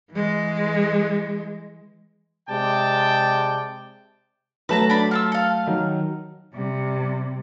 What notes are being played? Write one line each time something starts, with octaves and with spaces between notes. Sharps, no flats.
E3 G#3
C3 G#3 D5 G5 A5
F#3 A3 B4 A5 A#5
D4 B5
F4 A5 E6
A4 F5
D#3 F#3
C3 G3